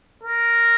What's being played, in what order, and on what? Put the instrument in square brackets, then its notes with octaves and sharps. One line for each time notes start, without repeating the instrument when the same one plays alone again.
[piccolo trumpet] A#4